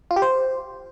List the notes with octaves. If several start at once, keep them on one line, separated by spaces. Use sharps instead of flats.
F4
G4
C5